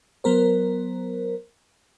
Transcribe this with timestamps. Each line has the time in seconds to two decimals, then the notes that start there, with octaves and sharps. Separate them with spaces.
0.24 F#3 B3 A#4 C5